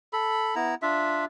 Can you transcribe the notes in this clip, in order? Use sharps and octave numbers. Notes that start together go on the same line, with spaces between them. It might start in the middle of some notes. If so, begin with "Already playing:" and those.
A4 B5
B3 E4 A#5
D4 F4 E5